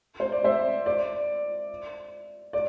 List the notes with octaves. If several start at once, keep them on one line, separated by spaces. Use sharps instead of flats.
C5
D5
C5 E5
D5
D5